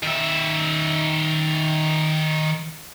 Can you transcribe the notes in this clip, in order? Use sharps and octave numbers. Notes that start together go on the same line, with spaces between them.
D#3 E5